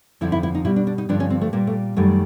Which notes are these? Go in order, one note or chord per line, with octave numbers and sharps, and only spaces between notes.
F2 D3 F3 E4
E4
E4
D#4
B2 G3 E4
D4
D4
D#4
G2 D3 F3 D4
C#4
C4
A3
A#2 G3 A#3
A3
F#2 D#3 G3 A3